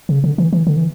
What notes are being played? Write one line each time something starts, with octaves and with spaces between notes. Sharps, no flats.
C#3
D3
E3
E3
D3
E3